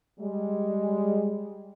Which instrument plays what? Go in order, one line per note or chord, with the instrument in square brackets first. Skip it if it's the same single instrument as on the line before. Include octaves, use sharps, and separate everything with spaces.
[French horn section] G3 G#3